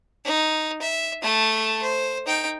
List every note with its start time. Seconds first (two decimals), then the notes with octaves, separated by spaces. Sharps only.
0.25 D#4
0.81 E5
1.22 A3 A4
1.82 C5
2.26 D#4 G5